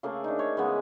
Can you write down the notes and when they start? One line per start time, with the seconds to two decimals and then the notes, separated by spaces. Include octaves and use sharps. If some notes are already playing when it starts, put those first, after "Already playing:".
0.03 C#3 A3 A#3 G#4
0.24 D4 D#4
0.39 C#5
0.57 C#3 E3 G#3 B3